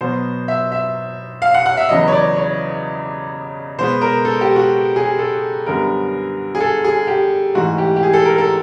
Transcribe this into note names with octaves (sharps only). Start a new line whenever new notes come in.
B2 F#3 B3 C5
E5
E5
F5
F#5
F#5
E5
E2 C#3 F#3 B3 D#5
C#5
D5
C#5
B2 G#3 B3 C5
A#4
A4
G4
F#4
G#4
A4
F#2 D3 G3 B3 A#4
G#4
A4
G#4
G4
G#2 E3 A3 F#4
G4
G4
G#4
A4
A#4
A4